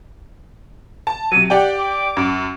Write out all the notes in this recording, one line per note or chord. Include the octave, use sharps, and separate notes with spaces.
A5
C3 F#3 D#7
G4 D5 F#5 G5
D6
F#2